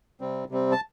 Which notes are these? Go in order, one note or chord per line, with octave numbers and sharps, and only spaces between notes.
C3 G3 C4
C3 G3 C4
A5